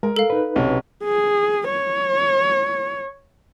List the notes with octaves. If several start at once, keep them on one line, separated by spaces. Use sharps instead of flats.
G#3 A#4
A4 F5
D#4 B4
B1 C3 C#4
G#4
C#5